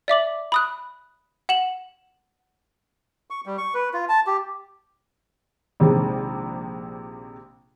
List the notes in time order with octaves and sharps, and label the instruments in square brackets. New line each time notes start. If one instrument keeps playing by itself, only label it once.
[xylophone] D5 E5 D6 F#7
B5 D#6 F#6
F#5 E7 F#7
[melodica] C#6
G3
C#6
B4
F4
A5
G4
[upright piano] A#1 C3 D#3 G#3